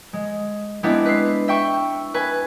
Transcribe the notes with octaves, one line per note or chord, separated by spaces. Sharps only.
G#3
G#3 B3 C4 D4 E4
B4 C7
E5 G5 C#6
B4 G#5